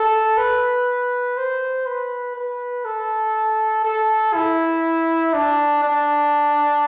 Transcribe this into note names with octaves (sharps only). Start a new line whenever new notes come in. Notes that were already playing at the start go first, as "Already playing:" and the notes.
Already playing: A4
B4
C5
B4
B4
A4
A4
E4
D4
D4